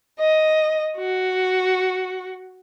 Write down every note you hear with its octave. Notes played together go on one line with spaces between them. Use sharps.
D#5
F#4